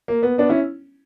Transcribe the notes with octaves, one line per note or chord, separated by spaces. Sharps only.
A#3
B3
B3 D4
C#4 E4